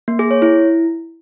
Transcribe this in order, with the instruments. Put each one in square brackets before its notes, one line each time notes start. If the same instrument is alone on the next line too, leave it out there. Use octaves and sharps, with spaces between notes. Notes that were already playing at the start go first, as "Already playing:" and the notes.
[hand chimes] A#3
G#4
C#5
E4